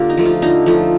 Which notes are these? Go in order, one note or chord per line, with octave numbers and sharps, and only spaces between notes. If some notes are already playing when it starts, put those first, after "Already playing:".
Already playing: D3 A#3 F4 G4
D#4
F3 A3
F4
D3 D#4
F3 A3